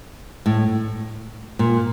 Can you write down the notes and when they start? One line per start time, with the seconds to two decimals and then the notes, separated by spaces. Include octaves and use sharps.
0.46 A2
1.59 A#2